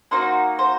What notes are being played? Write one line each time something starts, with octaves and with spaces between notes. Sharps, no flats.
A#3 D#4 F#4 C5
C5